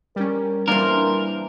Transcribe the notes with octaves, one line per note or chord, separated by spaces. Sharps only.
G3 C#4 A#4
A#2 E3 G3 A#3 D4 A#4 C5